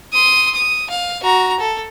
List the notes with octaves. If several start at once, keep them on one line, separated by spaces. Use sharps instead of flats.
C6 D#6
D#6
F5
F#4 A#5
A4